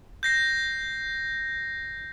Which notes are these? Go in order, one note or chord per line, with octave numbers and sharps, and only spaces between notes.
G6 A#6 C7